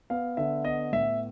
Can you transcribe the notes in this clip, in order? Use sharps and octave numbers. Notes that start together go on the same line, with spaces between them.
B3 F5
D3 E5
B3 D#5
A2 E5